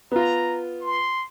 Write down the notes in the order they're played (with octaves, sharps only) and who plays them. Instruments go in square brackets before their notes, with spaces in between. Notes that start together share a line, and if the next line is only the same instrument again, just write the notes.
[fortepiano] B3 F4 [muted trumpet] A#5
[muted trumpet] C6